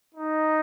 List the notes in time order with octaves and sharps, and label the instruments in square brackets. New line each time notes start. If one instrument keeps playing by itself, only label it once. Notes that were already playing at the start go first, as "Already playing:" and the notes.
[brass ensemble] D#4